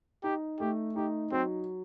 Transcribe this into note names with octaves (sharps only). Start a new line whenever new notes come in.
D#4 G4
A3 G4
D#4 G4
F#3 C4